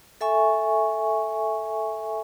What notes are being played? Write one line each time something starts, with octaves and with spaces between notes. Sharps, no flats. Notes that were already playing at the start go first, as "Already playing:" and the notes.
A4 E5 G#5 C#6